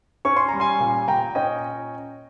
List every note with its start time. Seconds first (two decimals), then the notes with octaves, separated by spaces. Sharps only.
0.25 C#4 C#6
0.37 C6
0.48 G3 A#5
0.60 G#5 C6
0.80 A#2
1.08 A#2 G5 A#5
1.35 C#4 D#5 G5